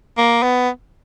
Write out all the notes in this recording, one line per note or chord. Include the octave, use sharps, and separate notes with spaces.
A#3
B3